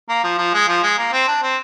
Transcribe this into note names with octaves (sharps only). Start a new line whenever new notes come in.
A#3
F3
F3
G#3
F3
G#3
A#3
C4
D4
C4